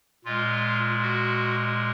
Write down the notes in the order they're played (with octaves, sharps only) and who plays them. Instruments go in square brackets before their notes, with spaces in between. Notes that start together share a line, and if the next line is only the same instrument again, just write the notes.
[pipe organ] A#2 G#3 F4
F#4